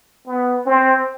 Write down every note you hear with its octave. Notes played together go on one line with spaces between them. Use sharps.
B3
C4